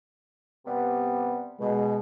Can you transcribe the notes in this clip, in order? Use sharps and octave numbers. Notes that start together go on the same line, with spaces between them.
C3 G3 B3
B2 G#3